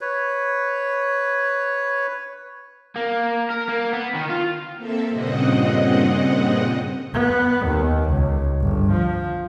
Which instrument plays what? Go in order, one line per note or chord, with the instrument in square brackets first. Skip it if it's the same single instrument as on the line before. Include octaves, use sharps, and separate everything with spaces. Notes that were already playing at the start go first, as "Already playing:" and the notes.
[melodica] B4 C#5
[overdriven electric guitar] A#3
A#4
A#3
B3
D#3
F4
[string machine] A#3 C4 A4 E5
G2 A#2 C#3 C4 D#5 F#5
[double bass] B3
D#2
C#2
G1
F3